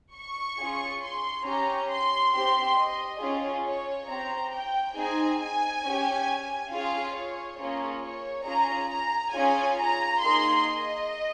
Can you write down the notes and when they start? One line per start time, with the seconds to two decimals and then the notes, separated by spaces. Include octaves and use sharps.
0.16 C#6
0.59 C#4 F4 G#4
1.03 C6
1.47 C#4 G4 A#5
1.91 C6
2.34 C4 G4 C6
2.78 D#5
3.22 C#4 F4 G#4
3.66 C#5
4.09 C4 G4 A#5
4.54 G5
4.97 C4 D#4 G#4 G#5
5.41 G#5
5.85 C#4 G4
6.72 C#4 F4 G#4 F5
7.16 C#5
7.60 A#3 C#4 F4 G#4 C#5
8.03 C#5
8.47 C#4 F4 G#4 A#5
8.91 A#5
9.34 C#4 F4 G#4 G#5
9.79 A#5
10.22 A#3 D#4 G#4 C6
10.66 D#5